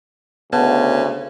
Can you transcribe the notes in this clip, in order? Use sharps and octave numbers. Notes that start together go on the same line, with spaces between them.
D2 C#3 B3 A5